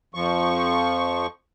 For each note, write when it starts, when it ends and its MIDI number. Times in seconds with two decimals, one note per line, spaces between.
0.14 1.27 41
0.14 1.27 53
0.14 1.27 85